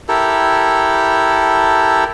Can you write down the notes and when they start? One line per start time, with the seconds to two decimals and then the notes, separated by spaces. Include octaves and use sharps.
0.09 E4 G4 A4 A#4